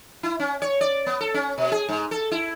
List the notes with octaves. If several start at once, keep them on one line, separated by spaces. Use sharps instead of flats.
E4
C#4
C#5
D5
B3
A4
C#4
B2
G#4
G#2
A4
E4